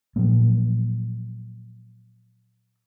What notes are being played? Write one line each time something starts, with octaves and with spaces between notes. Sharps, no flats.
A#2 F3 F#3 A#3